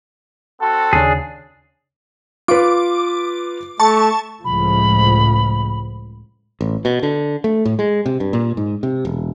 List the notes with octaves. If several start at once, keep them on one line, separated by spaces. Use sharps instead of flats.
C4 F#4 A4
D#2 C#3 D4 G#4
F4 B4 D6
A3 A5 C#6
C#2 A2 F3 B5
A1
B2
D3
A3
A2
G#3
C3
G2
A#2
G#2
C3
E1